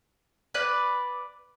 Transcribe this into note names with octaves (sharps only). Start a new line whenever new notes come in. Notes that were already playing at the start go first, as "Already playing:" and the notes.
B4 D5 F#6